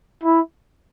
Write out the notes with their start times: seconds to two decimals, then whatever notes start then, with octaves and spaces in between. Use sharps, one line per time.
0.24 E4